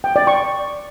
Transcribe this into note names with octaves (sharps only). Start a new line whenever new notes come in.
G5
D5
C#6